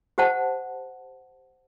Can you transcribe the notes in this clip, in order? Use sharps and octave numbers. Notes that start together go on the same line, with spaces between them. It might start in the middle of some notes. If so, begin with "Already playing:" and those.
G4 C5 F#5 A5